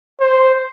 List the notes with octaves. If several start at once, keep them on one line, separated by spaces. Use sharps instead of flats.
C5